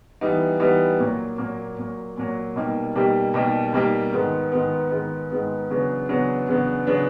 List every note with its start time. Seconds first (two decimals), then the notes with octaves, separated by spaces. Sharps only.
0.21 E3 G3 B3 D#4
0.60 E3 G3 B3 D#4
0.99 A#2 F#3 A#3
1.38 A#2 F#3 A#3
1.78 A#2 F#3 A#3
2.17 A#2 F#3 A#3
2.56 B2 G3 A#3 D#4 G4
2.96 B2 G3 A#3 D#4 G4
3.34 B2 G3 A#3 D#4 G4
3.73 B2 G3 A#3 D#4 G4
4.13 G#2 D#3 G#3 B3
4.52 G#2 D#3 G#3 B3
4.91 G#2 D#3 G#3 B3
5.30 G#2 D#3 G#3 B3
5.69 E2 C#3 F#3 B3 D4
6.09 E2 C#3 F#3 B3 D4
6.48 E2 C#3 F#3 B3 D4
6.87 C#3 F#3 B3 D4